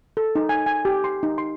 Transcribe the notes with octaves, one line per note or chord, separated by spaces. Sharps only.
A4
D#4
G#5
G#5
G4
C6
D#4
C6